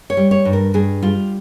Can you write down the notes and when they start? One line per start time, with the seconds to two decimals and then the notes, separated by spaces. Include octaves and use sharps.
0.10 C#5
0.17 G3
0.31 C#5
0.45 G2
0.53 A#4
0.74 G2 G#4
1.02 G3 F4